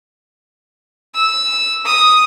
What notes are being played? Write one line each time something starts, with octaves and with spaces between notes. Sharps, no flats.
E6
D#6